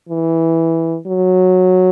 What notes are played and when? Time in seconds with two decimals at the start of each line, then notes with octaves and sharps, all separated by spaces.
0.08 E3
1.07 F#3